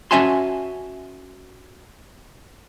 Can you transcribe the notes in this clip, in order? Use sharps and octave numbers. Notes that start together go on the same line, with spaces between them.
C#4 F#4 E5 G#5 A5 C6